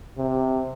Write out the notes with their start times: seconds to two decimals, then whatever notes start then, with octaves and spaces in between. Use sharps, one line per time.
0.18 C3